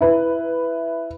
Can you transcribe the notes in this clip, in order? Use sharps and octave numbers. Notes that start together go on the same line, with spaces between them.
E4 B4